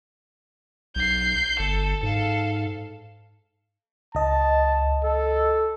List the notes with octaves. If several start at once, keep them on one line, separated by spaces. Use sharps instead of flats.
B1 G6 C7
G1 A4
G#2 A4 F5
C#2 D#5 A5
A4